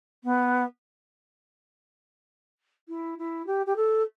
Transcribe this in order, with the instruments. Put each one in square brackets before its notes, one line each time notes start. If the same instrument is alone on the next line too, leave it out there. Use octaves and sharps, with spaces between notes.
[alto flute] B3
E4
E4
G4
G4
A4